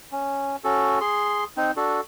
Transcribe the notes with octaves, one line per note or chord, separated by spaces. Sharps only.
C#4
C#4 F#4 A4
G#4 C6
C4 D#4
D4 F#4 A4